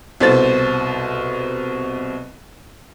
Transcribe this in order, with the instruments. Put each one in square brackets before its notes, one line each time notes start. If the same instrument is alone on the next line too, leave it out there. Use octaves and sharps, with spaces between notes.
[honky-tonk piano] C2 B2 A4 C5 A6